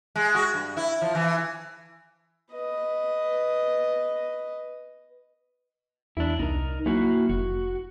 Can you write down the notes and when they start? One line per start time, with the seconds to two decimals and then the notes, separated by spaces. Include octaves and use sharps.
0.16 G#3
0.35 F#4
0.54 G2
0.77 E4
1.01 F3
1.15 E3
2.53 B4 D#5
6.17 E2 D4 E4
6.39 C2 D#4 A#4
6.86 F#3 A#3 E4 F#4
7.29 F1 F#4